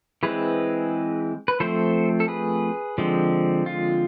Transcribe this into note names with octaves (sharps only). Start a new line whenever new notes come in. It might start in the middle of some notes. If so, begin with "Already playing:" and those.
E3 G#3 C4 G#4 B4
B4
F3 A3 C4 A4 C5
A4
G#4 B4
D3 F3 G#3 C4
F4